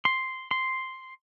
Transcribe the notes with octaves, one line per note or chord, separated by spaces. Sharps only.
C6
C6